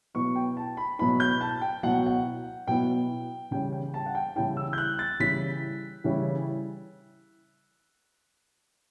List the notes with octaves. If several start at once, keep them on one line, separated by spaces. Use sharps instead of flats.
B2 F#3 B3 E4 C#6
G5
A5
B5
B2 F#3 B3 E4 B5
G6
A5
G5
B2 F#3 B3 E4 F#5
F#5
B2 F#3 B3 E4 G5
C#3 E3 G3 C#4 E4 G5
G5
A5
F#5
G5
C#3 E3 G3 C#4 E4 G5
E6
G6
F#6
A6
C#3 E3 G3 C#4 E4 B6
C#3 E3 G3 C#4 E4